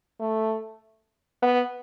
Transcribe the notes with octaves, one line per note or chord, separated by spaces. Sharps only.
A3
B3